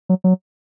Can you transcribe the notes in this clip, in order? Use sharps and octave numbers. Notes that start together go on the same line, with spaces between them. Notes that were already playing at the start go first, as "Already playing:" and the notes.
F#3
F#3